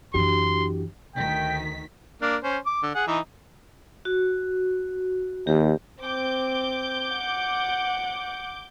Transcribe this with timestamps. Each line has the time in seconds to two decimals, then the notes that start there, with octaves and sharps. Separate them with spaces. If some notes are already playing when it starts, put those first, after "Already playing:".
0.14 F#2 E3 D4 F#4 G4 C6
1.16 D2 D#3 G5 B6
2.22 A#3 D4
2.44 C#4 C5
2.66 D6
2.83 D3
2.95 G#4 F#5
3.07 E3 D#4
4.05 F#4
5.47 D#2 G4
6.03 C4 D6 G6
7.15 F#5